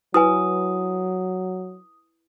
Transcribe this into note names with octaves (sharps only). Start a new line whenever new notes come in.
F#3 E4 B4 G#5 D#6